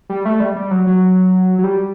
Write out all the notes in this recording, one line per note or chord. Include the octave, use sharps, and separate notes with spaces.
G3
A3
G3
G3
F#3
F#3
F#3
G3